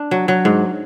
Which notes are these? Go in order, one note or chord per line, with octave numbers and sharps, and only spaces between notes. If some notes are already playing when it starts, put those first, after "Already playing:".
Already playing: D4
F#3
F#3
G#2